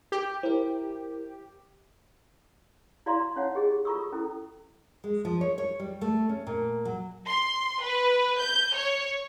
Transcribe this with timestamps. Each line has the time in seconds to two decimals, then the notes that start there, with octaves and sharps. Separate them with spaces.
0.12 G4
0.43 E4 A#4 C5
3.06 E4 F#4 D5 F5 A#5 C6
3.36 C#4 D#4 C#5 F5 F#5
3.55 G4 G#4 D#5
3.85 F4 A4 A#5 C#6 D#6 E6
4.12 C#4 E4 A4
5.04 G#3
5.25 F3
5.41 C#5
5.58 C#5
5.79 G3
6.01 A3
6.29 C#4
6.47 A#2
6.85 F#3
7.27 C6
7.82 B4
8.40 G6
8.75 C#5